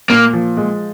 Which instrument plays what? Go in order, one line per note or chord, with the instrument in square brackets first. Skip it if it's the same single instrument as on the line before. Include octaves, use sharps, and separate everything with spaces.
[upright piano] A#2 [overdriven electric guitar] A#3
[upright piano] F3
G#3